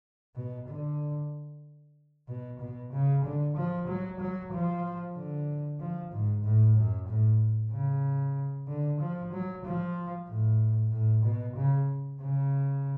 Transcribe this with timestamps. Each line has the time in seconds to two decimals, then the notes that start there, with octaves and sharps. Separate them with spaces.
0.36 B2
0.68 D3
2.28 B2
2.60 B2
2.92 C#3
3.24 D3
3.56 F3
3.87 F#3
4.19 F#3
4.52 F3
5.15 D3
5.80 F3
6.12 G#2
6.44 A2
6.76 F#2
7.08 A2
7.72 C#3
8.68 D3
9.00 F3
9.32 F#3
9.64 F3
10.28 A2
10.92 A2
11.23 B2
11.56 C#3
12.20 C#3